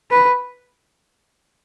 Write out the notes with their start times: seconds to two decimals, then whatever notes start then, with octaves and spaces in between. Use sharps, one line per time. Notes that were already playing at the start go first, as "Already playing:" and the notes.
0.11 B4